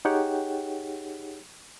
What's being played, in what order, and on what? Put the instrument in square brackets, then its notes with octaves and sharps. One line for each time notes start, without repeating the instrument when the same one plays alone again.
[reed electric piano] D#4 G4 G#4 C#5 F#5 G5